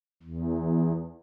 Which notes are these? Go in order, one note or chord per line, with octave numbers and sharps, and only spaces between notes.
E2